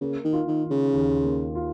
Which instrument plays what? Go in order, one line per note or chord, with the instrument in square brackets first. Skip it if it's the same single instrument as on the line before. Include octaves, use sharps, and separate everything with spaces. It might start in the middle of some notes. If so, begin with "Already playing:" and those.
[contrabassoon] C#3 [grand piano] A#3
[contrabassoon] D#3
[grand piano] F4
[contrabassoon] D#3
[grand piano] D#3
[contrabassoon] C#3
[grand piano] D#2
A#3
F4